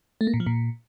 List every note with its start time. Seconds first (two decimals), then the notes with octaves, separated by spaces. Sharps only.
0.21 A3
0.27 A#3
0.34 A#2
0.40 F3
0.47 A#2